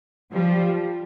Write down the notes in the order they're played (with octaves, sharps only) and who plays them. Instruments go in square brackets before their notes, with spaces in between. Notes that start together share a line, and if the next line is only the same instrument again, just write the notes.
[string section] F3 G3